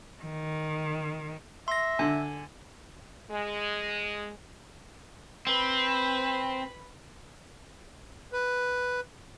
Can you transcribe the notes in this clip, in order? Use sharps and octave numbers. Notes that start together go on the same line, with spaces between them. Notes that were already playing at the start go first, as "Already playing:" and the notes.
D#3
E5 C6 A#6
D3 G#5
G#3
C4 B4 B5
B4